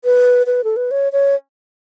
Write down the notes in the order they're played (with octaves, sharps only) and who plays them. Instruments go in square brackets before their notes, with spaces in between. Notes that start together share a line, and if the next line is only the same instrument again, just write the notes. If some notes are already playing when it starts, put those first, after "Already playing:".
[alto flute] B4
B4
A4
B4
C#5
C#5